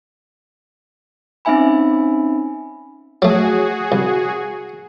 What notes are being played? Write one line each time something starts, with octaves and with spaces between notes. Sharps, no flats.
C4 C#4 D#4 E5 G#5 B5
F#3 A3 F#4 G#4
C2